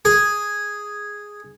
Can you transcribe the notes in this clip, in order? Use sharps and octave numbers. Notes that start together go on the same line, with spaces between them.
G#4